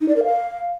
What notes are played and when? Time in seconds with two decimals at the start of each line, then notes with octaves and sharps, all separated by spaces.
0.01 D#4
0.09 D5
0.16 A#4
0.23 F5